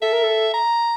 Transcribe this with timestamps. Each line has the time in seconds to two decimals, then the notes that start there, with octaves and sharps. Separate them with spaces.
0.02 A4 E5
0.13 A#4
0.23 A4
0.54 A#5